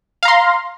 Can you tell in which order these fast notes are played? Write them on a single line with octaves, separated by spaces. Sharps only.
F5 A#5 C6